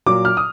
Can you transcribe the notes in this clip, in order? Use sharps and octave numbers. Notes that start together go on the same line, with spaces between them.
A#2 F#3 D6
F6
D#6